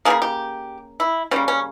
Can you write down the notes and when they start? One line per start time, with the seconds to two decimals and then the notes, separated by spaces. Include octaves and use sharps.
0.05 C#3 F3 A#3 G#4
0.22 G4
1.00 E4
1.31 C#3 G3 A#3 C#4
1.48 C#4